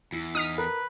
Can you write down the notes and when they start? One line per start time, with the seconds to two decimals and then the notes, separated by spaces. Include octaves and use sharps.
0.12 E2 E4
0.35 D#4 D#6 F6 B6
0.58 A#4 B4